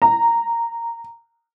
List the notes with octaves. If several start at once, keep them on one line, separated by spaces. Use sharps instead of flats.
A#5